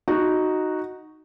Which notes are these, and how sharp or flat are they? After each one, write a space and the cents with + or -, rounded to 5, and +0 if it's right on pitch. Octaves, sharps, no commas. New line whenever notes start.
D#4 +0 F#4 +0